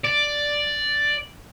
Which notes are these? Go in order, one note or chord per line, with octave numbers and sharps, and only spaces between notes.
D5